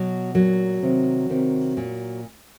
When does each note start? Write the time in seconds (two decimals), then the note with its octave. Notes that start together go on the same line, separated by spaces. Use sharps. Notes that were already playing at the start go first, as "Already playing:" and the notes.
Already playing: B2 F#3
0.34 A#2 F#3
0.82 C3 D#3
1.29 C3 D#3
1.77 A#2